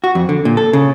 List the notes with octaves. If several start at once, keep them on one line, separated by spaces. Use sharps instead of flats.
F#4
F2
D3
A#2
A4
C#3